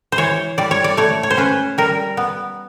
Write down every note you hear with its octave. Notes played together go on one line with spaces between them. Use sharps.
C5
E3 C#5
G3 D5
C#5
D5
A3 C#5
C#5
C5
C#4 B4
G3 A#4
B3